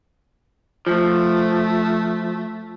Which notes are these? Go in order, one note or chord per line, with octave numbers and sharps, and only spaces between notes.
F3 A3